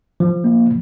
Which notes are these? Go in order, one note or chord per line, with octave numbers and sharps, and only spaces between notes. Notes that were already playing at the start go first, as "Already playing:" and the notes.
F3
A#3